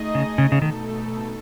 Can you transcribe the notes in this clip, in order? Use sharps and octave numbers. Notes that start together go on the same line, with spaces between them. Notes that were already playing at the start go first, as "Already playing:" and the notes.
Already playing: A3 D#4 G#4 D#5
C#3
C#3
C#3
B2 D#3 A3 D#4 A4